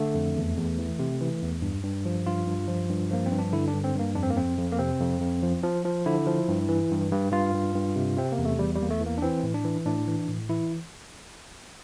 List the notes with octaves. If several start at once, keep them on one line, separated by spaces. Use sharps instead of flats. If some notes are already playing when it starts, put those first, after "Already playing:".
Already playing: D3 A3
F2
E2
E2
E3
C3
E3
E2
G2
G2
F3
G2 F4
G2
F3
G2
F3 A#3
C4
G2
D4
D3 E4
D4
G2
C4
G2 A#3
F2 D4
C4
A#3
F2 C4
F2
A#3
C3 C4
F2
F2
F3
F3
F3
D3 E4
F3
G2
E3
G2
G2
G2 F4
G2
G2
C3
C3 C4
A#3
E2
A3
E2 G3
G3
E2 A#3
A3
E3
A#3
D4
E3 C4
A2
D4
E3
A2 D4
E3
A2
E3 E4